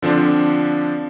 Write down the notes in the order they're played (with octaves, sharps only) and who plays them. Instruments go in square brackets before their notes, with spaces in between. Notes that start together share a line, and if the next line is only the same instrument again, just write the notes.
[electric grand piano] D3 F3 C4 D4